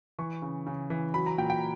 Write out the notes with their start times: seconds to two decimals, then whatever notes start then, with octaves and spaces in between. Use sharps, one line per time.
0.19 E3 C#6
0.42 C#3
0.66 C#3
0.90 E3
1.14 F#3 B5
1.26 A#5
1.38 A#2 G5
1.50 G5